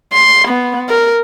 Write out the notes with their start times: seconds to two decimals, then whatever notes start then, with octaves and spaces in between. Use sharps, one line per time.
0.13 C6
0.48 B3
0.89 A#4